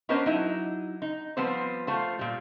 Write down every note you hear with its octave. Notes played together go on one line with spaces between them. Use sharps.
B3 C#4 D4 A#4 C5 D#5
F#3 D#4 E4
D#4
F3 G3 B3 C4 C5
A3 F4 C5
A#2 G3